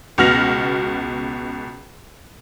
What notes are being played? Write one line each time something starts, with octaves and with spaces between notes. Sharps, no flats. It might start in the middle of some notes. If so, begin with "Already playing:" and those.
C#2 B2 F#4 F6 A#6 F7